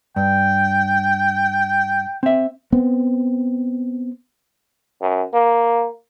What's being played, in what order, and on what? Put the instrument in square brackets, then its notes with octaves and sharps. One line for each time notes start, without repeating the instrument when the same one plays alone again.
[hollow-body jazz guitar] G2 [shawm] G5
[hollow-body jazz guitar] C4 E5
[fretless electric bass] B3 C4
[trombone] F#2
A#3